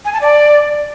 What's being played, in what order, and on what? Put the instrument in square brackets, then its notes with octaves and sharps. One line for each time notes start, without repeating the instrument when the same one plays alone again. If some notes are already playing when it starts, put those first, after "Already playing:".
[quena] G#5
A5
D5